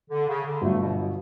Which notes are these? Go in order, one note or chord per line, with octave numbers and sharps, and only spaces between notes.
D3
C#3
D3
G1 G2 F#3 A3
B2
B2